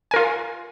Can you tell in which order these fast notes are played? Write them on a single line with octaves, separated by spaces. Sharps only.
G#5 A#4 F4